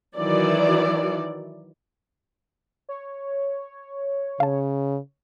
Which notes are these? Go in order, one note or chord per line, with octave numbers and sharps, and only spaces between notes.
D#3 E3 F#3 D5
C#5
C#3 F5 A5